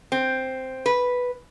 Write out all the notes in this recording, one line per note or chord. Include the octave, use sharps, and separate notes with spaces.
C4
B4